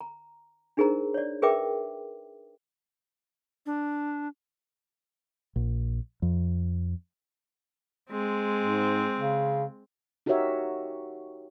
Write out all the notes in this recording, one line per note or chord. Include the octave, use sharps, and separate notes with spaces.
A#5
D4 D#4 G#4 A#4 C5 A#5
C#5 D5
G#4 A#4 B4 E5 G5 D6
D4
A#1
F2
G#3 C4
G#2
C#3
D#4 F#4 G4 A#4 C#5 E5